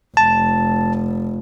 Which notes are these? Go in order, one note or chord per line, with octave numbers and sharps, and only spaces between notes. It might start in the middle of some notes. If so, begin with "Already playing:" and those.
F1 A5